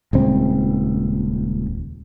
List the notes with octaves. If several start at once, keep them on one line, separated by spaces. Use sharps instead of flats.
D#1 C#2 C4